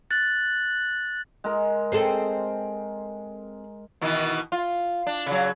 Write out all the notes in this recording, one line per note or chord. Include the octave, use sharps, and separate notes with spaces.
F#6 A6
G#3 A#4
C4 G#4 A4
B2 D#3 E3
F4
D4
C#3 F#3